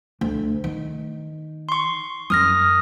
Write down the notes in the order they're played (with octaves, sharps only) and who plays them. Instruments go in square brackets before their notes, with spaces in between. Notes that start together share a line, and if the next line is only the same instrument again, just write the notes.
[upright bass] D2
D#3
[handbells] C6 C#6
[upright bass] F#2 [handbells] D#6 F6 A#6